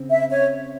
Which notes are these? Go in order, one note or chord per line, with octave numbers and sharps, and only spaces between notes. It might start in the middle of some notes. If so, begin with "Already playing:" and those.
Already playing: C#3 C4
E5
C#5